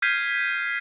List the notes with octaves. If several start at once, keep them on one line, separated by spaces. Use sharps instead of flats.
F6 G6 G#6 B6 C7 D#7